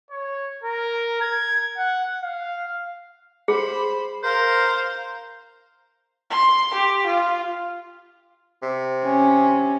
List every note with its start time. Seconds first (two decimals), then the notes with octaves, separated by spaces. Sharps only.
0.11 C#5
0.63 A#4
1.21 G#6
1.77 F#5
2.21 F5
3.48 G#4 C5 B5
4.23 A#4 C5 F5 A#5
6.30 C6
6.73 G4
7.06 F4
8.63 C3
9.03 C#4